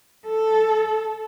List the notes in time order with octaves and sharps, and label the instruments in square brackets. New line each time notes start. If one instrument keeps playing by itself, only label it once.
[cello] A4